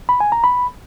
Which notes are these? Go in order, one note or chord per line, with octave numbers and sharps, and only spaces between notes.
B5
G#5
A#5
B5